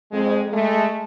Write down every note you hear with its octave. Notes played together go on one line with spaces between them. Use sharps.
F2 G#3
G#3 A3